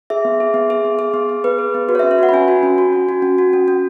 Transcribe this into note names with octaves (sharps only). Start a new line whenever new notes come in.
G#4 E5
B3
G#4
B3
G#4
B3
G#4
B3
G#4
B3 B4
G#4
B3
F#4 B4
C#5
E5
C#4
C#5
F#4 F#5
B5
C#4 G#5
F#4
C#4
F#4
C#4
F#4
C#4
F#4
C#4
C#4